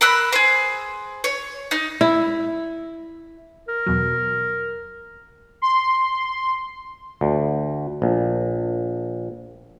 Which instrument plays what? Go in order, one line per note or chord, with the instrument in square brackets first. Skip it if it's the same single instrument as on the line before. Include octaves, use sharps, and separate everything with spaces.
[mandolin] A#4 B5 E6 F#6
G#4 C5
C#5
D#4
[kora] E4
[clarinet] A#4
[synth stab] E2 B2 F#3
[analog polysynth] C6
[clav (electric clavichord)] D2
A#1